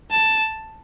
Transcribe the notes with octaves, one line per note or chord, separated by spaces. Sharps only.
A5